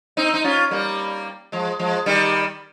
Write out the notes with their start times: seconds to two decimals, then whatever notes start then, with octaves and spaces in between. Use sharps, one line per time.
0.17 C4 D#4
0.34 D#4
0.44 C#4 F4
0.71 G3 A#3
1.52 F3 G#3
1.79 F3 G#3
2.06 D#3 G3